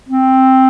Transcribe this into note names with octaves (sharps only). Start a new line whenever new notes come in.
C4